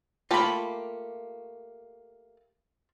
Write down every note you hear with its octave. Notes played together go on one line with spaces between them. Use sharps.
A3 A#3 F4 G4 B5